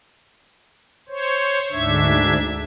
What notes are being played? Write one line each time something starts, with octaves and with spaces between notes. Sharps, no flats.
C5 C#5
D2 G#2 D4 E5 G#6